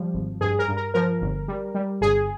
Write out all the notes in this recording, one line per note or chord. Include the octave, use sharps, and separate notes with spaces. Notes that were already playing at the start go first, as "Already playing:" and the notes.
Already playing: F3 G3
G#1
G2 G#4
A#4
G2
A#4
F3 A#4
G1
G3
G3
G1 G#4